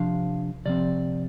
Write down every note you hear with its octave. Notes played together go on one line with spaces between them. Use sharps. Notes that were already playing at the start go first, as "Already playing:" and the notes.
Already playing: C3 F3 D4 F5
C3 F3 C4 D5